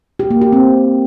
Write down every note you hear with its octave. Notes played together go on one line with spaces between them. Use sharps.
G4
A#3
G4
C4